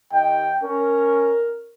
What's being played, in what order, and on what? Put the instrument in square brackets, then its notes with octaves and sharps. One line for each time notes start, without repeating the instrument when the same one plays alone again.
[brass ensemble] D#2 D#5 [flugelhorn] G5
[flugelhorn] C#4 [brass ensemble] A#4